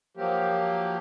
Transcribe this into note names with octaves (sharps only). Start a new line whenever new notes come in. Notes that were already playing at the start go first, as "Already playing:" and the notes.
F3 F#3 A#3 G4